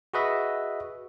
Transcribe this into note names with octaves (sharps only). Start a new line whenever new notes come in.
F#4 G#4 B4 D#5 E5